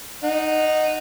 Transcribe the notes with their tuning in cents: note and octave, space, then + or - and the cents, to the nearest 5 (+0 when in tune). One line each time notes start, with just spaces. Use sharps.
D#4 -10 F#5 +0